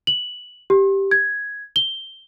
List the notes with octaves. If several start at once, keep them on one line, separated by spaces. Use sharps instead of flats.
F#7
G4
G#6
G7